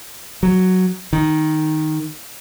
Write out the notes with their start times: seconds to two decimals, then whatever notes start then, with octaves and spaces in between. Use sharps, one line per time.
0.43 F#3
1.13 D#3